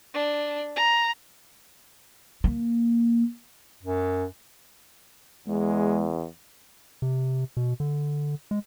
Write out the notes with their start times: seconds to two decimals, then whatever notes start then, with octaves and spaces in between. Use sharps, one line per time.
0.14 D4
0.76 A#5
2.44 A#3
3.83 F#2
5.47 E2 G#3
7.02 C3
7.57 B2
7.80 D3
8.51 G#3